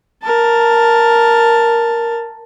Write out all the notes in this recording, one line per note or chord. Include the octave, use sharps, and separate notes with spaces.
A#4 A5